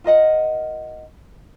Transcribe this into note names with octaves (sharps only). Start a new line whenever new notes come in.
F4 A#4 D#5 F#5